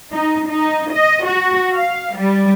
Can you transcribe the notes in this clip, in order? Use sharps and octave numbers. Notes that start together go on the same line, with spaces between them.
D#4
D#4
D#5
F#4
F5
G3